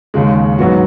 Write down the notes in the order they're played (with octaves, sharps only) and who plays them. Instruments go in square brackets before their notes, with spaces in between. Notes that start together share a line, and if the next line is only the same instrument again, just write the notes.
[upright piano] D#2 C#3 G#3
G#2 F#3 B3 F#4